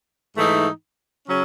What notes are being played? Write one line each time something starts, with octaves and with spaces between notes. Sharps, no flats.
G#2 E3 A3 D#4
C#3 F#3 C#4